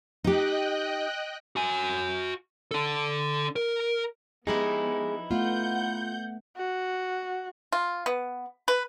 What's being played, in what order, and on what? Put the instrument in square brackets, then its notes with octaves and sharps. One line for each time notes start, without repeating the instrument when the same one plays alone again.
[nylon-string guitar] D#4 G4 [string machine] D#5 G5 F#6
[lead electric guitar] F#4 G#5
D4 A4
A#4
[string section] F3 B3 [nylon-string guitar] G#3 G4 G#4 [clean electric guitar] D#4 E4
[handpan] A3 B3 [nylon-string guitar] F4 [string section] F#5 G6
[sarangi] F#4
[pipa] F4
B3
B4